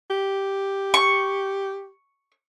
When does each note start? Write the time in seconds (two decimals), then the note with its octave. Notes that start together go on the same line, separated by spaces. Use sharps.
0.10 G4
0.94 C#6